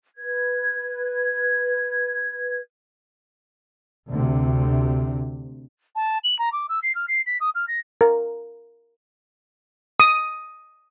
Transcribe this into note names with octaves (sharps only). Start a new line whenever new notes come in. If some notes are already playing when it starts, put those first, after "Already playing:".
B4 G#6
D2 C3
A5
F#7
A#5
D6
E6
C7
F6
C7
B6
D#6
F6
A#6
A#4
D#6